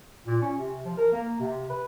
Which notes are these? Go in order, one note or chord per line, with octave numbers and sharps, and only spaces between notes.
A#2
C#4
C3
F3
A#4
A#3
C3
B4